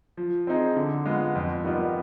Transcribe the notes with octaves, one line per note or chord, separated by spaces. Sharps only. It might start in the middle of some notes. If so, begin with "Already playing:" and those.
F3
C4 D#4 G#4
D3
G#3 B3 F4
F2
D#3 G3 B3 F4